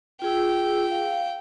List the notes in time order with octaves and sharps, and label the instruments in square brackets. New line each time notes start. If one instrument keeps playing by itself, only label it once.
[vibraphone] F4 G#4 E6 [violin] G5
[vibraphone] F5